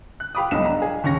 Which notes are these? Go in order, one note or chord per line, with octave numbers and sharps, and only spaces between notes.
F#6
G4 F5 B5 D6 D#6
B1 G#2 G3 D#4 E7
D4 A#5
G#4 F5
D#2 C#4 C#6 A#6